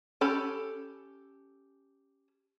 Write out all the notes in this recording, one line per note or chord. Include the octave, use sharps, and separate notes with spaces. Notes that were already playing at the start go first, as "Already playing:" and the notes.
C#4 G4 A4 B5